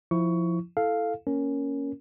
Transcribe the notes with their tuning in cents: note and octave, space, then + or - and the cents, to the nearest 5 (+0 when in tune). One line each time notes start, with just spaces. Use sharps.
F3 +0 E4 +0 C#6 +15
E4 +0 A4 +0 F5 +0
A#3 +0 C#4 +0 A#4 +0